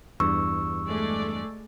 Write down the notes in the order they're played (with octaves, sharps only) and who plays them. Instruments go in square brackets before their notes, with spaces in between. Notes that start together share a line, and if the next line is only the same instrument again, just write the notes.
[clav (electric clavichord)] E2 G2 [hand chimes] C#6 E6
[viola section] G#3 A3 D5